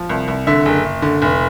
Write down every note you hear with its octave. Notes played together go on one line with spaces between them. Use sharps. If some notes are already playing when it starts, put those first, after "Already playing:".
Already playing: F3
C2
C2
D3 E5
F#1
F#1
D3
F1